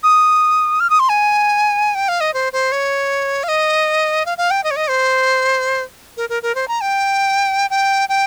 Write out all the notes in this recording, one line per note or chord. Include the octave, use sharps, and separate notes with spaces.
D#6
F6
D#6
C6
G#5
G5
F5
D#5
C5
C5
C#5
F5
D#5
F5
F5
G5
D#5
C#5
D#5
C5
A#4
A#4
A#4
C5
A#5
G5
G5
G5